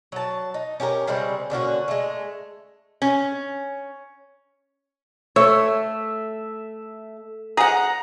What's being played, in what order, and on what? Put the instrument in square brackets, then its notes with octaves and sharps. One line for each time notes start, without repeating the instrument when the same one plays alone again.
[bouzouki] F#3 A5
D#4
C#4 G4 A4 A#4
C#3 G3 G#3 C4
A#2 D3 C#4 F#4
G#3 A3
[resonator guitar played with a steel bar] C#4
[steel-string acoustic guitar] A3 [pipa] C#5 [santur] E5
[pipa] G#4 F#5 [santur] A#5